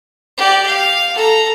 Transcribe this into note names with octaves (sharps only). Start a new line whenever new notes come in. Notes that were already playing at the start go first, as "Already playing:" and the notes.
G4 D5
F5
A4 A#5